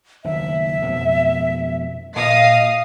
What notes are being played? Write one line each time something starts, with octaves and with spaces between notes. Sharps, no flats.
F#1 D#2 E5
F2 B2 A3
A#2 D#5 F5 D#6 C7